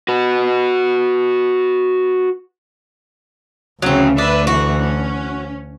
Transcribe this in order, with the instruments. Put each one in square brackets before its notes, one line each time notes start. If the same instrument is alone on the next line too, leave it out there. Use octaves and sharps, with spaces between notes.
[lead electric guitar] F#4 B4
[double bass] D2 [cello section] C#3 E3 [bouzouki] F#3 C4
[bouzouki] D4 [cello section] B4 E5
[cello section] E3 A3 [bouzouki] F#4
[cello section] C#4